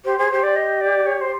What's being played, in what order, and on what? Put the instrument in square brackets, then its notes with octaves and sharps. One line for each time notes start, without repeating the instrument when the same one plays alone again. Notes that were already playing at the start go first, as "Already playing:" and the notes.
[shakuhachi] G4 [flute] C5
[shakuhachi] G#4 [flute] C5
[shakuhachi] G4 [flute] C5
[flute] D5
D#5
D5
C#5
C5